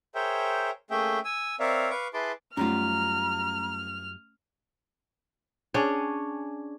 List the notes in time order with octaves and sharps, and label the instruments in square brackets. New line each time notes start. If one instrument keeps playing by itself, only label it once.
[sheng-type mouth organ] G#4 A#4 C5 C#5 E5 G5
A3 A#3 C#4 G#4 E5 G5
G#5 E6
C4 A#4 C#5 D5 E5 F5
B4 F5 C#6 D6
E4 G#4 B4 A5 C6 D6
[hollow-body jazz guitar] F#2 G3 F4 [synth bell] A3 C#4 [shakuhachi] A#5 [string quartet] F6
[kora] C#4 D4 G#4 C#5